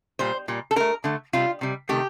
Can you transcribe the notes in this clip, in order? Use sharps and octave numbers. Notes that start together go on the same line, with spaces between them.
A#2 G3 C5
A#2 G3
A4
D3 A3 A#4
D3 A3
C3 G3 F4
C3 G3
C3 D#3 A3 G4